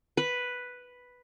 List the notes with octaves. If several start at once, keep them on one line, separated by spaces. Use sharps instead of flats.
B4